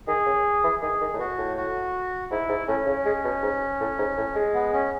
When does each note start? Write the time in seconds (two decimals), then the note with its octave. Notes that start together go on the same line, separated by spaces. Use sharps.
0.07 D#3 G#4
0.26 C#3
0.64 E3
0.81 D#3 G#4
1.01 D#3
1.14 A2
1.19 B2 F#4
1.38 A2
1.57 F#4
2.31 G#2 E4
2.49 G#2
2.68 A2 C#4
2.87 C#3
3.05 G#3
3.25 B2
3.43 G#2
3.80 A2
3.98 G#2
4.17 A2
4.35 G#3
4.54 B3
4.73 C#4